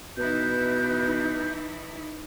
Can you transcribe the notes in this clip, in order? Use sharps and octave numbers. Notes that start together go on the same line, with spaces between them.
B2 E3 D#4 E4 B4 G6